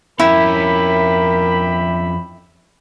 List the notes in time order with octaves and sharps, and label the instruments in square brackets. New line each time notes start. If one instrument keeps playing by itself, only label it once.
[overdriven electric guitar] F2 C#4 [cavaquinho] E4 [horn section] G4 E5 B5 [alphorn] A#4